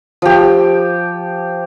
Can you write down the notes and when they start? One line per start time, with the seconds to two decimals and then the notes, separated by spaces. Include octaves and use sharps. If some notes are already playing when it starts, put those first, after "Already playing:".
0.22 F3 G4